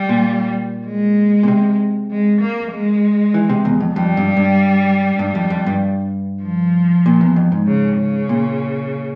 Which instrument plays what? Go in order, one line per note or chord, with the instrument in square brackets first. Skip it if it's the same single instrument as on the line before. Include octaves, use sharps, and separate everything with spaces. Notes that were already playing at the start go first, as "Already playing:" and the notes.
Already playing: [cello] G3
[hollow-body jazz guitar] A#2
[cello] G#3
[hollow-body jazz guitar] A#2
C3
[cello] G#3
A#3
G#3
[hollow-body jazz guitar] E3
C3
E2
F2
[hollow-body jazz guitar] F2 [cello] G3
[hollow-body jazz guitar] G2
G2
G2
F2
F2
G2
[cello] F3
[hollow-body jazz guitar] A#2
E2
F2
G#2
[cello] C#3
C#3
[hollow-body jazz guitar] A#2